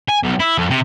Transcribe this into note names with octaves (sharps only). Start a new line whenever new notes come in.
G#5
B1
E4
F2
C3